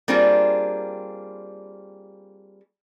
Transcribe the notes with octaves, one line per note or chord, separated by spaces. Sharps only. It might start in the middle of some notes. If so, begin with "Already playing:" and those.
G3 A#3 C4 D4 F4 G#4